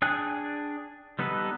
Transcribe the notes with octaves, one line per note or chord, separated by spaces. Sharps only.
D4 G#4 G5 G#5 F#6
G3 B3 D#4 A4 B4